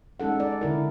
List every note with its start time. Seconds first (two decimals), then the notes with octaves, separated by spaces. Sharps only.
0.20 G#3 C#4 D#4 A4 F#5
0.40 D5
0.61 D3 E4 A#4